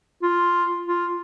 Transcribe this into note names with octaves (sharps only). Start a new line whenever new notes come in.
F4
F4